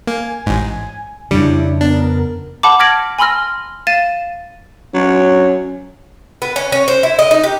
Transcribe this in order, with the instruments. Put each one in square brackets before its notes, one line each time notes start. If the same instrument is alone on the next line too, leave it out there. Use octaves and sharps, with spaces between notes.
[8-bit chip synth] A#3 [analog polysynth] G#5
[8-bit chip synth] A1 G#2
[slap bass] F2 C#3 [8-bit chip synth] G3 [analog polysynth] D4 E4
[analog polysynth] B3 A#4 [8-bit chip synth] D4
[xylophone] F#5 A5 B5 D6
F6 G#6 A#6 B6 D7 F#7
G#5 B5 C6 E6 F6 A#6
F5 A6 D#7 E7
[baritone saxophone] F#3 [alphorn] C#4
[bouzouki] B3
C#4
C#4
C5
E4
D#5
D#4
G4